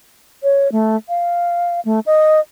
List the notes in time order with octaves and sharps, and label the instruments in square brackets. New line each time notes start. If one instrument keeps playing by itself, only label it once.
[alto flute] C#5
A3
F5
A3
D#5